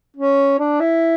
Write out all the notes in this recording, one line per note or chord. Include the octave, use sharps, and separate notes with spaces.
C#4
D4
E4